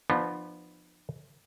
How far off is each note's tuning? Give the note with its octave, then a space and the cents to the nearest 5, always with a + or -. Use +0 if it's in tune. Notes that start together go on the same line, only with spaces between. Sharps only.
F3 +0 B3 +0 D4 +45